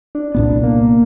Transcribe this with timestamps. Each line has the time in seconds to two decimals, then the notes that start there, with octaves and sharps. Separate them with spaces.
0.15 D4
0.35 C2 A#2 B3
0.63 A#3